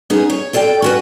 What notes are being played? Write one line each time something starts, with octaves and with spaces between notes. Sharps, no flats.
B3 C#4 D#4 G#4
C#5
F4 A4 D5 F#5 G5
C#4 F#4 B4